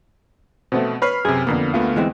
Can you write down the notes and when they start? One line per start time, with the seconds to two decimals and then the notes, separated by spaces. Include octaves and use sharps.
0.72 B2 A3 B3 C4
1.02 B4 C#5 B5 F6 C7
1.25 F#2 C3 G#4
1.47 F2 D3 A#3 B3
1.74 D2 A3 B3 F4
1.96 E3 G#3 C4